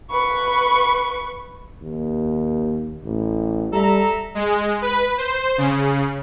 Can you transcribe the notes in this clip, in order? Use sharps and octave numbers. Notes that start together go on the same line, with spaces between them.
B4 C#6
D#2
A1
G3 A4 E5 A#5
G#3
B4
C5
C#3